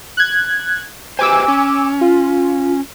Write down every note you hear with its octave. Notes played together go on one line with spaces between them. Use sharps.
F#6 G#6
G4 B4 C5 G#5 D6 E6
C#4
F4